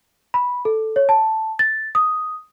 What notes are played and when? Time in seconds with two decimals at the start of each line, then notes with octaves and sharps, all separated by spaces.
0.34 B5
0.65 A4
0.96 C#5
1.09 A5
1.59 A6
1.95 D#6